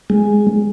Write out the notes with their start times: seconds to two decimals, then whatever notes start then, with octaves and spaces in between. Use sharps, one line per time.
0.10 G#3